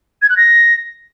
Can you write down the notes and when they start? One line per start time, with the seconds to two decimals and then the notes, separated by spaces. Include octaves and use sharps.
0.22 G#6
0.29 F#6
0.37 A#6